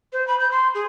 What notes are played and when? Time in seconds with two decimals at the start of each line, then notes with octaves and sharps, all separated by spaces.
0.13 C5
0.28 B5
0.40 G6
0.52 C6
0.75 G#4